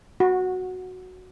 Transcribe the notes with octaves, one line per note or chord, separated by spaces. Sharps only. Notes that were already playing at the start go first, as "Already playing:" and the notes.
F#4